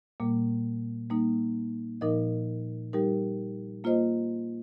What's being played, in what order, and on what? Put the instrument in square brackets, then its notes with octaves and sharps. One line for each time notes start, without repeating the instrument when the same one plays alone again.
[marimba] A#2 G3 A#3
G3 A#3 D#4
A#2 F3 D#4 A#4 D#5
G3 D#4 G4 A#4
A#3 F4 C5 D#5